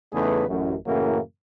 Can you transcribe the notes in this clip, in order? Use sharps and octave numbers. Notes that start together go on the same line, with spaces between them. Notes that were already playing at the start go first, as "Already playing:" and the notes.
E2 C#3 A3 D#4 G#4 B4
A1 F#2
F#2 A2 C#3 E3 F#3 A#3